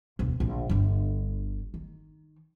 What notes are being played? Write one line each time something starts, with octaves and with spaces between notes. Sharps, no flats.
E1 D2
A#1 D3
G1 D3
D#3